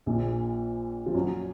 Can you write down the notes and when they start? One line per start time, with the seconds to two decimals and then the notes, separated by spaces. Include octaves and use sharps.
0.06 A#1 A#2
1.06 F3
1.14 F#2 F#3